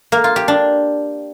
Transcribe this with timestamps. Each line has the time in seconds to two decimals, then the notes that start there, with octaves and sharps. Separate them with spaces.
0.12 A#3
0.24 F4
0.36 G4
0.48 D4